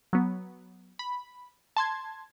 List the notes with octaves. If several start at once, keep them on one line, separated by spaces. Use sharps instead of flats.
F#3 B3
B5
A5 C6 G#6